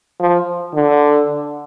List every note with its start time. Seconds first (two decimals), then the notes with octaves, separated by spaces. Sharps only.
0.20 F3
0.74 D3